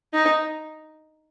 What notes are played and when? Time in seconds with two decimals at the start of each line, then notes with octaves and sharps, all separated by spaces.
0.13 D#4